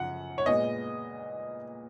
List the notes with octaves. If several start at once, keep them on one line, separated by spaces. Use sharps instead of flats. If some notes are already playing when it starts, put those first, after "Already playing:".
Already playing: F#2 C#3 F3 F#5
C#5
A#2 G#3 B3 D#5